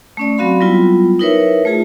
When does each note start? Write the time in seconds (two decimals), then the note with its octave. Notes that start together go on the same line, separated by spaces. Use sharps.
0.17 A3 C#4 D5
0.37 F#3 C4 F#4 F5 B5 C6
0.60 F#3 G3 B3 E4 F4
1.19 D#4 E4 A#4 B4 C#5 E5
1.65 A3 F4 G#4 A5